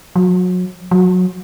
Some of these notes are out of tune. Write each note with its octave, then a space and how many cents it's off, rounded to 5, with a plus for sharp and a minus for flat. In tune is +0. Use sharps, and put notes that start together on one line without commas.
F#3 -30
F#3 -20